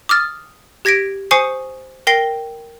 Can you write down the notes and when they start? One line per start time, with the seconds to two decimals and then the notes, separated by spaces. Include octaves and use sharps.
0.09 D6 D#6 F6 A6
0.85 G4 G#6 A#6 B6 D7
1.31 C5 G#5 C#6 D#6 C7 C#7
2.07 A#4 G5 A#6 C7 G7